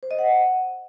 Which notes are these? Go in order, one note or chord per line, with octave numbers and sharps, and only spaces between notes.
C5
D#5
F#5